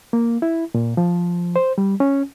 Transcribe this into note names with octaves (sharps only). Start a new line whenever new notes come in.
A#3
E4
A#2
F3
C5
G3
C#4